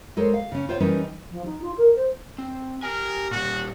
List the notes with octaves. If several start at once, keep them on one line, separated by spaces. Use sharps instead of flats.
G#3 A4 A#4 C5 C#5
F5
C#3 C#4
F4 C5 C#5 F#5 G5
E3 G3 C#4 D#4 A#4 B4
F3
D#4
F4
A#4
C5
C4
G4 A#4 G#5
A#2 G3 F#4